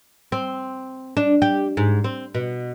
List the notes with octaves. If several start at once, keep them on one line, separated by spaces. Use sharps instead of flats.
C4
D4
G4
G#2
C4
B2